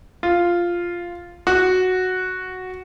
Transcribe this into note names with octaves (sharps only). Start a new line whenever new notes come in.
F4
F#4